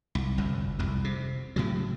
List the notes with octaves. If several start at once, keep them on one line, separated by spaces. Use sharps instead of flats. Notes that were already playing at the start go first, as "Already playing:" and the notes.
C2
G1 C2 F2
C2 F2
C3
A2 C#3 F#3